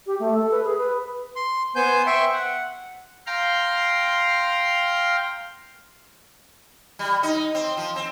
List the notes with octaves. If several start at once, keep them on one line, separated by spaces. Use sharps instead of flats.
G4
A3
A4
B4
G#4
B4
C6
B3 C5 G#5 G6
E5 G5 C6 C#6
F#5
F5 G5 A#5 C6 F6 G6
G3
D#4
C4
F3
C4